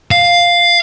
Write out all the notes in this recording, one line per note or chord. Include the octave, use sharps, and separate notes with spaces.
F5